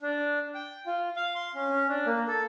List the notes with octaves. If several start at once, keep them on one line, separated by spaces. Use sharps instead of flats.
D4
G5
F4
F5
C6
C#4
C#4
D4
A#3
A4